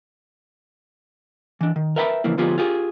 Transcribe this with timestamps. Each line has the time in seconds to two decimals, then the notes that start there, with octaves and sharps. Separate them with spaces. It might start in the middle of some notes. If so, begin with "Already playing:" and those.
1.61 E3 D4
1.76 D#3
1.96 A#4 B4 E5 G5 A5 B5
2.24 C#3 E3 F3 A#3 E4
2.37 D3 F3 B3 F4 G4 G#4
2.58 F4 G4 G#4